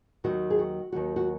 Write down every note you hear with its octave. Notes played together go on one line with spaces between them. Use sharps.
D#2 D#3 F#3 F#4
G#4
F#4
D#2 D#3 F#3 F#4
F#4